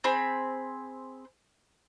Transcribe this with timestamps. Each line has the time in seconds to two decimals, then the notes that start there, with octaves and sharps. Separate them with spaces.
0.04 C4 G#4 B5